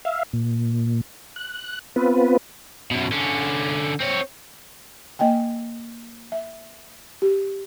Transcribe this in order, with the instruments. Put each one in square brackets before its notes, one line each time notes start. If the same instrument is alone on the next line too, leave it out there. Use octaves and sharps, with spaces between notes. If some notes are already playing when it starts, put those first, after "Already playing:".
[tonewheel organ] E5 F5
A#2
F#6
B3 C4 F4 B4
[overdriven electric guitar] F#2 B2
D3 C#4
C4 C#5
[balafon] A#3 D#5 G5 G#5
E5
G4